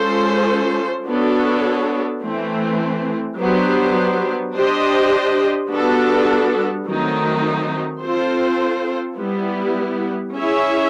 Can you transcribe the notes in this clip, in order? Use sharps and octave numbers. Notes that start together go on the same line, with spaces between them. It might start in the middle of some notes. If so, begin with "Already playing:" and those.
Already playing: G#3 C#4 F4 A4 C5
B3 D4 F#4 A4 C#5
E3 A3 C4
F#3 B3 D4 G4 C5
D4 G4 C5 D#5
G3 B3 D4 F#4 A4
D#3 F#3 A3 C4 D#4
C4 F4 A4 C5
G3 B3 E4
C#4 E4 G#4 C#5 E5